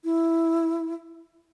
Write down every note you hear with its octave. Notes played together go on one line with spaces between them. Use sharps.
E4